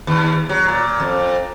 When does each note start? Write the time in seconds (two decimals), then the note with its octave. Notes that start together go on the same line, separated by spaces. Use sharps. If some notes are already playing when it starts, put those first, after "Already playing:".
0.07 D#2
0.49 F#3
0.68 A#2
1.00 F2